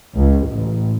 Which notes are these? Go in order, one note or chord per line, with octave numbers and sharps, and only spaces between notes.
C#2
A1